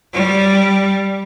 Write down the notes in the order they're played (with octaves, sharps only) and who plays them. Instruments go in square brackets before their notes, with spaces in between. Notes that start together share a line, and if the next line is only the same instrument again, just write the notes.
[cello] G3